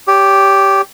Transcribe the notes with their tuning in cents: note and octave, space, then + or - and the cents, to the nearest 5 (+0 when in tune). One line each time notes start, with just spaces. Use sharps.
G4 +0 C#5 +35